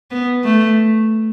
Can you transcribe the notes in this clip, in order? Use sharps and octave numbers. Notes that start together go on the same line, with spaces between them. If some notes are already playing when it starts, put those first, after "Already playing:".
B3
A3